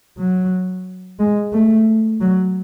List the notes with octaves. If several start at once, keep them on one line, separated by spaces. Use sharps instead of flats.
F#3
G#3
A3
F#3